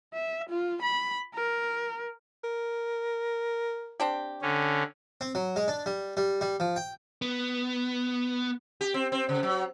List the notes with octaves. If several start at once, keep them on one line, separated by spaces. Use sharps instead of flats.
E5
F4
B5
A#4
A#4
C4 D4 G4
D3 C#4
C4
F#3
G#3
D4
G3
G3
G3
F3
G5
B3
G4
C4
C4
C#3
F#3